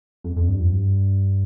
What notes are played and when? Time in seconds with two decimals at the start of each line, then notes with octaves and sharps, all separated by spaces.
0.24 F2
0.36 F2
0.48 G2
0.59 F2
0.71 G2